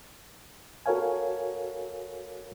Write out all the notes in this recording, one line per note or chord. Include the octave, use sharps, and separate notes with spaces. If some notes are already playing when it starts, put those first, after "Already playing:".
F#4 A4 A#4 C#5 F5 G#5